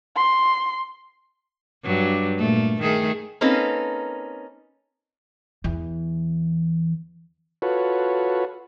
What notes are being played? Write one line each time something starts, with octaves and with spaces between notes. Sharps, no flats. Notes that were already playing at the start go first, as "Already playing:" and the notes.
C6
G2 F#3
A#2 A3
D#3 A3 G#4
A#3 C4 C#4 D#4 A4 B4
E2 E3
F4 F#4 A4 B4 C#5